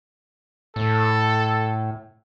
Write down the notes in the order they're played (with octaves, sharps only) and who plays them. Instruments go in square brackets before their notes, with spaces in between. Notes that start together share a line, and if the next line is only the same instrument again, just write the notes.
[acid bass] A2 [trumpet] A4